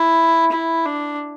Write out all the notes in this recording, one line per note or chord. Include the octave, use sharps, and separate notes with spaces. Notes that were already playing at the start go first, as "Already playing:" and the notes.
Already playing: E4
E4
D4